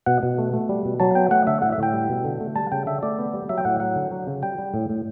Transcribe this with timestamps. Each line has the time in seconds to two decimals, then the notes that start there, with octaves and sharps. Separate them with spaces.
0.06 B2 F#5
0.23 B2
0.38 A3
0.53 A3
0.69 G3
0.85 B2
1.00 F#3 A5
1.15 B3 G5
1.31 A3 F#5
1.47 D3 E5
1.62 A2 F#5
1.72 E5
1.78 A2 G5
1.93 G3
2.09 B2
2.25 D3
2.40 A3
2.56 G3 A5
2.72 C#3 G5
2.87 D3 E5
3.03 A3 D5
3.19 B3
3.34 G3
3.49 F#3 E5
3.58 G5
3.65 A2 F#5
3.80 F#3 F#5
3.96 D3
4.11 F#3
4.27 C#3
4.42 G3 G5
4.58 G3
4.74 A2
4.89 A2